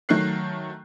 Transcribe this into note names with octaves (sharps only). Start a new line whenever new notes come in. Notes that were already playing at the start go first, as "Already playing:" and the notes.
D#3 F#3 A3 F#6 C7